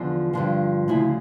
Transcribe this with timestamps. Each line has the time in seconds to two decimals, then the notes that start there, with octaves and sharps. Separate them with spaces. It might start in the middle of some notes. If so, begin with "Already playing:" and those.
Already playing: E2 D3 F3 F4
0.33 G2 D3 F3
0.88 D2 C#3 F3 E4